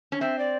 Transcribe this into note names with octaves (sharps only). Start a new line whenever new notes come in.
C#4
C4 E5
D5